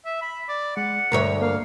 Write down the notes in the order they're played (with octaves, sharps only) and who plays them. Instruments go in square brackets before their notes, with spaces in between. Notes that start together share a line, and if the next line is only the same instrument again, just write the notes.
[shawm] E5
B5
D5
[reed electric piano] G#3 [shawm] F#5
[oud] D2 G2 C#5 [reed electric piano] A#4 E5
[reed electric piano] A#3 [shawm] F5